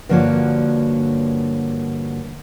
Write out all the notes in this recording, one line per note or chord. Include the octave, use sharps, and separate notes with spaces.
G2 D3 F3 A#3 F#4 C#5